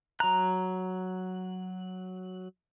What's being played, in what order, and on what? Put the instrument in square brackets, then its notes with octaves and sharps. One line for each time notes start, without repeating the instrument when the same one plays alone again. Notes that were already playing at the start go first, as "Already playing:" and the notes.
[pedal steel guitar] F#3 F#6 [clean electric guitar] A#5